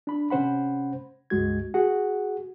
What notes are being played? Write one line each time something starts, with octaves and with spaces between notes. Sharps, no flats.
D4 B5
C3 C#4 C5 F#5 B5
C#2 G2 G#3 F#4 G#6
F#4 G#4 F#5